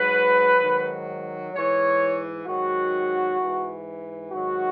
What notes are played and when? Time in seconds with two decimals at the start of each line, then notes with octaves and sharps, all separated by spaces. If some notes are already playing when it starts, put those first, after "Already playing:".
Already playing: G#2 F#3 B4
0.62 G#2 D#3 F#3
1.54 G#2 E3 C#5
2.46 G#2 D#3 F#3 F#4
3.39 G#2 E3
4.31 G#2 D#3 F#3 F#4